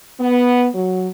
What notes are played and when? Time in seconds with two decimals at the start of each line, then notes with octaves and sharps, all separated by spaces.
0.19 B3
0.74 F#3